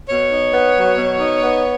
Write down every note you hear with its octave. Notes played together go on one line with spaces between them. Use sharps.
B2 C#5
D#4
B3
F#3
B2
D#4
B3